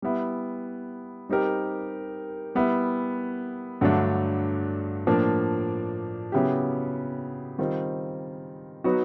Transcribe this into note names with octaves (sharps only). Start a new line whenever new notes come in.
G3 B3 E4
G3 C4 D#4 G4 A#4
G3 B3 E4
G2 D3 F#3 A3 D4
A2 F3 A#3 D4
C#3 F#3 B3 E4 G4
D#3 G3 C4 F4
F#3 B3 D#4 F#4 B4